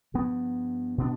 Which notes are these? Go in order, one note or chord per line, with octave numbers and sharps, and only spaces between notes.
G2 F3 B3
B2 B3 D4